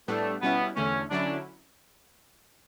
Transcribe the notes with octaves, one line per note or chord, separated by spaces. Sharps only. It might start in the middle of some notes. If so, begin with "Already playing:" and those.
A2 G3 A3 B3 D4
B2 G3 B3 C#4 E4
E2 D3 A3 C#4
D3 F#3 C#4 D4 E4